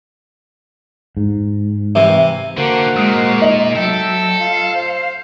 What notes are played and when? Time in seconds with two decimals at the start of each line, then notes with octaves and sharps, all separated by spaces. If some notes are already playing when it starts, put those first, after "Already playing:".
1.17 G#2
1.95 C3 E3
2.57 D3 A#3 F#4 C5
2.96 A#2 G#3 D#6
3.41 D#4 D#5 F#7
3.75 F#3 A4 E5 G5
4.39 F4 F5
4.75 C5